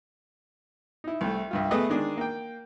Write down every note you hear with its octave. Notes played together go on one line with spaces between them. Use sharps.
D#4 E4
C2 A3
C2 G2 F4
A3 B3 G#4 B4 D#5
D#3 G#3 D4 G#4
A#3 G5